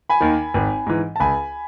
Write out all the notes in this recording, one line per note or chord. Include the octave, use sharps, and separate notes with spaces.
G#5 B5
D#2 D#3
G#1
G#2 E3
A5
C#2 G#5 B5